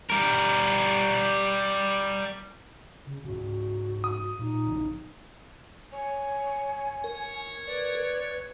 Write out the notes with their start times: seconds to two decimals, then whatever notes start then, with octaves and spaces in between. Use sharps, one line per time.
0.10 G3 A#4
3.06 C#3
3.25 G#2 C#3 F#4
4.04 D#6
4.39 A#2 D#4
4.66 A#1 C#3 F3
5.92 C#5 G#5
7.04 A#4 C#5
7.67 B4 D5